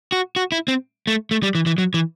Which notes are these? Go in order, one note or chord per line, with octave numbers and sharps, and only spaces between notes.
F#4
F#4
E4
C4
A3
A3
G3
E3
E3
F#3
E3